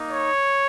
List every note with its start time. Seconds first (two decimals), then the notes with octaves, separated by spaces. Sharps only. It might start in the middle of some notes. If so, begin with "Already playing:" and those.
Already playing: A#3 D#4
0.09 C#5